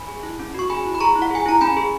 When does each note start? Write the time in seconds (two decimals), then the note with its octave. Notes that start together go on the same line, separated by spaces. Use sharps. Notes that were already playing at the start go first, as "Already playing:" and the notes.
Already playing: G#5 B5
0.08 G#4
0.23 E4
0.39 C#4
0.54 F#4 C#6
0.70 G#4 G#5 B5
0.85 E4
0.95 B5
1.00 G#4 A#5 C#6
1.15 E4
1.22 F#5
1.31 G#4 G#5
1.46 E4 A#5
1.61 C#4 G#5 B5
1.77 G#4